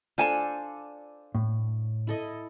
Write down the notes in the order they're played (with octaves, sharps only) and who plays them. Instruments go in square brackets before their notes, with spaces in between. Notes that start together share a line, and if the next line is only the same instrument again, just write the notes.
[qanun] D4 A4 C5 [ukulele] F4 G#5 A5
[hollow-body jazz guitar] A2
[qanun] E4 A4 D#5